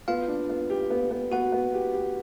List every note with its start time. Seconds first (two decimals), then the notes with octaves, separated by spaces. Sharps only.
0.08 B3 F4 F5
0.28 D4
0.49 B3
0.70 G4
0.90 B3
1.11 B3
1.32 B3 F#4 F#5
1.52 B3
1.74 G4
1.94 G4